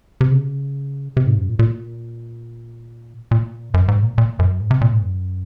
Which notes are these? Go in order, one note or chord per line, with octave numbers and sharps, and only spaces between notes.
C3
C#3
C3
G#2
F#2
A#2
A#2
A#2
F#2
G#2
A#2
A#2
F#2
G#2
C3
A#2
G#2
F#2